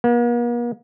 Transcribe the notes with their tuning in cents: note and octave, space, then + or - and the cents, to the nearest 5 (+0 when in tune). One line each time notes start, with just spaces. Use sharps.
A#3 +45